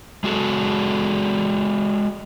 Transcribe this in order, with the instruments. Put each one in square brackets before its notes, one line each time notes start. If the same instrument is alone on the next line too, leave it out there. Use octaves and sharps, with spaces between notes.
[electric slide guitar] G#3 F#4 G#4 A4